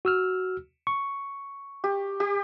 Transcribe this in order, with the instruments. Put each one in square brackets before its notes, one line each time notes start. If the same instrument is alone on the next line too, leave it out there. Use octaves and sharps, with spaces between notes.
[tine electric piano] F#4 E6 F6
C#6
[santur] G4
G4